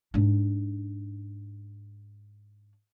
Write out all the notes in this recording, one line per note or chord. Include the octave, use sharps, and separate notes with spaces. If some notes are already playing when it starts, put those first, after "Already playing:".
G#2 D4